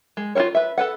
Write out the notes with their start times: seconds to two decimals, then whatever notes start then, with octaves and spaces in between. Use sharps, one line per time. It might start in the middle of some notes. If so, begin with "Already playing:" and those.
0.17 G#3
0.35 F4 F#4 A4 A#4 C#5
0.55 B4 E5
0.78 A4 B4 F#5